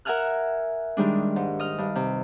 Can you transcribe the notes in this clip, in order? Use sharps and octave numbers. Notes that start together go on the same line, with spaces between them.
A#4 E5 F#5 G#5 F6 F#6
D#3 G3 G#3 D4
G#2
D#5 F6
G2
C3